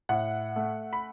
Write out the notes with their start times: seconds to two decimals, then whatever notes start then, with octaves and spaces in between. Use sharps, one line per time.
0.09 A2 F#5
0.56 A3
0.93 B5